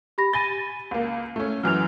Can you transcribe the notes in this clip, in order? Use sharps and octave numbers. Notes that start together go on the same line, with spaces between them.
G4 B5 A#6
G#5 B5 A6 D#7 G7
C#2 A#3
A3 C#4
F#2 E3 F#3 F6 F7